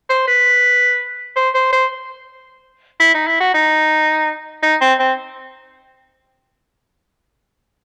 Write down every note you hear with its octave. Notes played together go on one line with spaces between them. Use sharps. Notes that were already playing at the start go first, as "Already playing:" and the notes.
C5
B4
C5
C5
C5
E4
D#4
E4
F#4
D#4
D#4
C4
C4